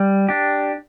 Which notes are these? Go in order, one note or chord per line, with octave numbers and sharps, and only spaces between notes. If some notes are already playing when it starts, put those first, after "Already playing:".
Already playing: G3
D4 G4